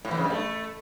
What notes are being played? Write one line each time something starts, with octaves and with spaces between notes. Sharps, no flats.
A2
E3
C#3
G2
A3